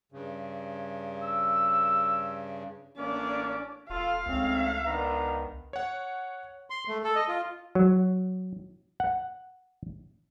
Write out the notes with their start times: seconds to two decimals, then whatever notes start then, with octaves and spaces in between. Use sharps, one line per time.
0.12 G2 C#3
1.22 E6
2.98 A1 A#3 C#4 D4 D5
3.90 D#1 F4 A4 F5
4.26 C#2 G#2 A3 C4 C#4
4.86 D#3 B3 D4 A#5
5.73 C#5 F#5
6.70 C6
6.88 A3
7.04 A4
7.15 D#5
7.28 F4
7.75 F#3
9.00 F#5